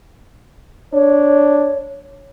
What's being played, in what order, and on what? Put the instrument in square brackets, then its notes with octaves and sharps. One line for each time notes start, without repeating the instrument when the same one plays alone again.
[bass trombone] D4 [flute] C#5